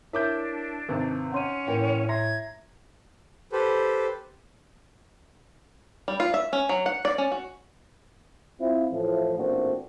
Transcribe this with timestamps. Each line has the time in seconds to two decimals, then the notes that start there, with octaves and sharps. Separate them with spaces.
0.13 D4 E4 A#4 C#5 E5 D6 G6
0.89 G#1 C3 B4 A5
1.32 C#4 F#5 C6 D#7
1.67 A2 E3 A#3 G5
2.09 E5 A#5 C6 G#6 A#6
3.52 G4 A4 B4 C5
6.08 G3
6.20 F4
6.34 E5
6.53 C#4
6.69 F#3
6.86 F#5
7.05 D5
7.18 C#4
7.32 F#4
8.60 C4 E4 F4
8.92 A2 E3 F3
9.37 A1 A#2 A3 C4 D4 F#4